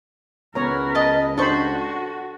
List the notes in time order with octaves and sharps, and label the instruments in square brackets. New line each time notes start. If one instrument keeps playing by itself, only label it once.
[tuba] C#2 [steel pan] B3 C#5 A#5 [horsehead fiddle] A#4 B4
[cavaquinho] D#5 A5
[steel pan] D4 C5 B5 [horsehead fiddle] F#4 [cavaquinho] A4 C#6